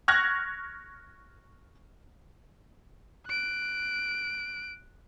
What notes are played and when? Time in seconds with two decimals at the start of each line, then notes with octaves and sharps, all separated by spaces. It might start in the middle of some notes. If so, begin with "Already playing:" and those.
0.08 C#6 F6 F#6 G#6 A#6
3.27 F#6 D7